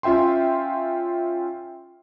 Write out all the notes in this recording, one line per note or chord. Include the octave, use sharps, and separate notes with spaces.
C#4 F4 E5 G5 C6